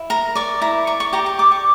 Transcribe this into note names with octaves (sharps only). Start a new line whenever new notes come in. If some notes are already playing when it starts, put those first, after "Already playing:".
Already playing: E4
A#4 A#5
D5 C#6
E4 A#5
D5 C#6
C#6
G4 A#5
C#6
D5 D6
C#6